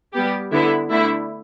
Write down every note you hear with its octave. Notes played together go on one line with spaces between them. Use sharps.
G3 B3 G4
D3 B3 E4
D3 A3 E4